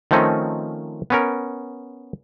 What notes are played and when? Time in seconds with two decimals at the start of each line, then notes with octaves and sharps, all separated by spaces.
0.11 D#3 F3 A3 C4 C#4 D#4
1.10 B3 C#4 A#4